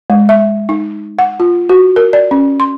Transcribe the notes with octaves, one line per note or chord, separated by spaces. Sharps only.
G#3
E5
D#4
F#5
F4
F#4
A#4
D5
C#4
C6